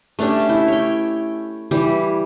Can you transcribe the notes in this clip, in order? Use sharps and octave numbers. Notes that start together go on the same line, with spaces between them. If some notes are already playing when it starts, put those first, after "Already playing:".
A3 C#4 D4 G4
E4
C#5 G5
E3 G3 G4